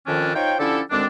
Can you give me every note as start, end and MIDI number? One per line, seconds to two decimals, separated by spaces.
0.07 0.35 41
0.07 0.35 51
0.07 0.35 61
0.07 0.35 62
0.35 0.55 63
0.35 0.55 65
0.35 0.55 72
0.35 0.55 73
0.35 0.55 79
0.59 0.80 50
0.59 0.80 53
0.59 0.80 61
0.59 0.80 64
0.59 0.80 67
0.59 0.80 69
0.91 1.06 38
0.91 1.06 51
0.91 1.06 56
0.91 1.06 60
0.91 1.06 62